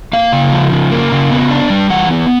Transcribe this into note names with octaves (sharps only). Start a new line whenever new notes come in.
A#3 F5
C#3
F3
C#3
A#3
C#3
B3
D4
G3
E3 F#5
B3